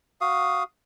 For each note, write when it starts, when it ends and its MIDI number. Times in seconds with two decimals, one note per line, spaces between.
0.21 0.63 66
0.21 0.63 77
0.21 0.63 87